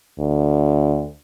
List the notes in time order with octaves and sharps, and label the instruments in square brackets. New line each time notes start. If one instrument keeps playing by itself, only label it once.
[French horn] D2